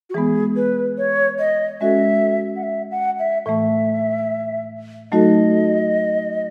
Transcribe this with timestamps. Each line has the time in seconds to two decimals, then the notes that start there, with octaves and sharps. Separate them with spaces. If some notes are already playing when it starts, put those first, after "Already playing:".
0.10 F#4
0.14 E3 G#3 B3 G#4
0.56 B4
0.98 C#5
1.39 D#5
1.81 G#3 C#4 F#4 A4 E5
2.56 F#5
2.63 E5
2.91 F#5
3.19 E5
3.46 A2 E3 A3 E5
5.12 F#3 A3 D#4 F#4 A4 D#5